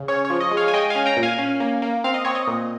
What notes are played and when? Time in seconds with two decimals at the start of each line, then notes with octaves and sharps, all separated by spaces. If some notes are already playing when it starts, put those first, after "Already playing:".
Already playing: C#3
0.08 C#4 C#5
0.25 C#5
0.30 F3
0.40 D#5
0.51 G#3
0.57 C#5 F5
0.68 G#5
0.74 G#3 D#5 G5
0.90 F5 G#5
0.95 C#4
1.06 G5 A#5
1.17 A#2
1.23 F5 G#5
1.39 C#4
1.60 A#3
1.82 A#3
2.04 C4 F5
2.14 D#5
2.25 C4 C#5
2.35 D#5
2.47 A#2